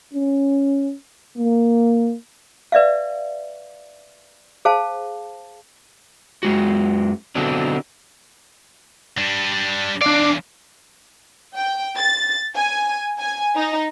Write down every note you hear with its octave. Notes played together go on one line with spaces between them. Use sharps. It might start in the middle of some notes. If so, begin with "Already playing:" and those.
C#4
A#3
B4 D5 E5 F5
G#4 C5 F5 A5
F#2 G#3 F#4
B2 D3 F#3 C4 D4
G3 D4
E2 D4 D5 F5
G5
A6
G#5
G#5
D#4